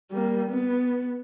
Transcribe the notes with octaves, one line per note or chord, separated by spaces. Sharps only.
G3 A#3
B3